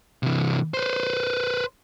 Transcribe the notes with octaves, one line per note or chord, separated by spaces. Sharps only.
C3 E3
B4 C5